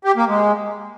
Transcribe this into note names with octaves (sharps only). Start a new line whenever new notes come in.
G4
A#3
G#3